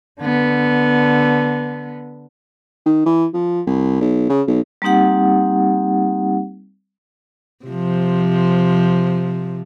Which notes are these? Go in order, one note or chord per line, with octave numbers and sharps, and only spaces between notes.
D3 B3
D#3
E3
F3
C2
B1
C#3
B1
G3 A#3 C4 D#4 G4 F#5
C3 F3